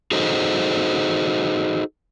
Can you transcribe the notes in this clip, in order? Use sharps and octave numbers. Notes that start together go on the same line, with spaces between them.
D#4 F#4 G#4 A4 C5 D#5